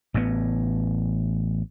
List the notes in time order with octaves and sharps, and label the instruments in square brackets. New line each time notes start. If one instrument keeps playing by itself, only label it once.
[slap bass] A1 A2 C#3 B3